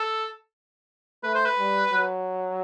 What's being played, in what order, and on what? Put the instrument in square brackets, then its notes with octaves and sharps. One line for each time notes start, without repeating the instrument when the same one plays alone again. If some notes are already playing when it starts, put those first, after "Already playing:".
Already playing: [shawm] A4
[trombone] A3 [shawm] B4
[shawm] C5
B4
[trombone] G3
F#3